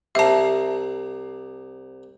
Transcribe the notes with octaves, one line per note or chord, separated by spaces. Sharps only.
C2 E5 A5 A#5